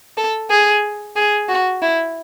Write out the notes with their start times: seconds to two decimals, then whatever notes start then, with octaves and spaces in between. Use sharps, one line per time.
0.17 A4
0.50 G#4
1.16 G#4
1.49 F#4
1.82 E4